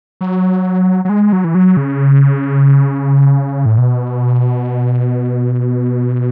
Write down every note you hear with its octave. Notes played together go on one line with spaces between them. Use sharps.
F#3
F#3
G#3
F#3
E3
F#3
C#3
A2
B2